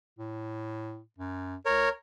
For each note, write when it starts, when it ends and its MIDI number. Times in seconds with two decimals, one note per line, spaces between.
0.19 1.01 45
1.19 1.56 42
1.66 1.87 37
1.66 1.89 70
1.66 1.89 73